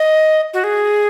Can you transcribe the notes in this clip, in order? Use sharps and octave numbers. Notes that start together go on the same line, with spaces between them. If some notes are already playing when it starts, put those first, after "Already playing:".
Already playing: D#5
F#4
G#4